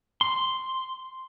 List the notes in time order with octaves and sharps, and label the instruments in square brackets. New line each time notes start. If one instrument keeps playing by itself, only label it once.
[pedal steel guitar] C6